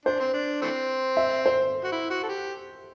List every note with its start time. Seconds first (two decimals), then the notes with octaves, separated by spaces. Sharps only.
0.05 D4 C5
0.20 C4
0.33 D4
0.62 E3 A3 C4
1.17 E5
1.46 C5
1.84 F#4
1.92 E4
2.10 F#4
2.23 A4
2.29 G4